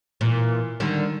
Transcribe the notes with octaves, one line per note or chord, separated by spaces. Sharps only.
A#2 E3
D3 D#3 G3